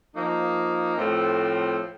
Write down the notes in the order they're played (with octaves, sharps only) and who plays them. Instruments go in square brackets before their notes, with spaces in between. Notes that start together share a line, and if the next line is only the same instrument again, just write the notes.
[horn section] F3 A#3 D#4
A2 F3 A3 C4